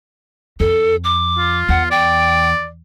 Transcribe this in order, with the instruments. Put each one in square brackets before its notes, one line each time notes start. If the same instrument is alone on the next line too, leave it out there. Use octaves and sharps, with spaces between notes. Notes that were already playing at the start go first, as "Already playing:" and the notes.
[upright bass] F2 [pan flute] A4
[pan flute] D6
[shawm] F4
[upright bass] E2 [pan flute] F#5
[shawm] D5 [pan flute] G5